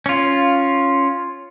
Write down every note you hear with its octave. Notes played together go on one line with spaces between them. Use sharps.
C#4 F4